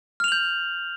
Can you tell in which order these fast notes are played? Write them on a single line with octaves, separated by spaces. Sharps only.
F6 F7 F#7 G6